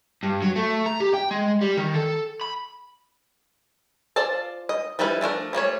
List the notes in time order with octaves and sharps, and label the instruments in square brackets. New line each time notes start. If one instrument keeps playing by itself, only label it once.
[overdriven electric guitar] G2
F#3
A3
A#5
G4
G5
G#3
G3
D#3
A4
B5
[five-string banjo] F4 C5 D5 A5
D#5
F3 G3 D#4 E4 B4
F3 A3 D4 A#4
F3 G3 A3 C#5